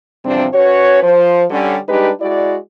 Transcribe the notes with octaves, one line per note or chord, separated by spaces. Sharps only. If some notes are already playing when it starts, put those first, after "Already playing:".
E2 C3 F3 G3 C4 D4
C#4 F#4 B4 C#5
F3 C5
D3 G3 C#4
G3 G#3 D4 D#4 G4 B4
G#3 E4 F#4 D5